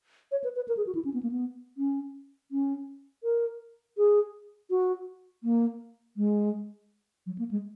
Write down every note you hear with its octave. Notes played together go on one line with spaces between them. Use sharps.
C#5
B4
B4
A#4
G#4
F#4
E4
C#4
B3
A#3
B3
C#4
C#4
A#4
G#4
F#4
A#3
G#3
F#3
A#3
G#3